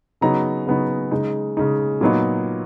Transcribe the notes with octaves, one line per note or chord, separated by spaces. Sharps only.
C#3 F#3 B3 D#4 A#5
C#3 F#3 B3 D#4
C#3 G#3 D#4
C#3 G#3 D#4
A#2 F#3 B3 D#4